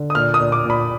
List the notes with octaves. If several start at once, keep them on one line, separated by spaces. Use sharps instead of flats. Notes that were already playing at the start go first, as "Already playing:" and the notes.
Already playing: D3
D#6
A#2 F6
D#6
A#2
D6
A#2
B5